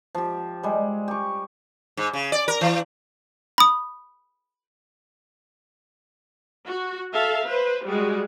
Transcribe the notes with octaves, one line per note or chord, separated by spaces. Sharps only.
F3 G4
G3 G#3
G4 C#6
G#2
C#3
D5
A#4
E3
B5 D#6
F#4
A4 E5 F5
B4 C5
G3 G#3 F#4